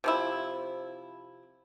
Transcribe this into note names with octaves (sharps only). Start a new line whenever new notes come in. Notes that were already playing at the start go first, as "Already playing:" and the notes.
C3 F3 E4